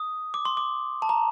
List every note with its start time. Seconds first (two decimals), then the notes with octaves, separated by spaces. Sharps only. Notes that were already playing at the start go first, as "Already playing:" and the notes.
Already playing: D#6
0.34 D6
0.45 C6
0.57 D6
1.02 A5
1.09 A#5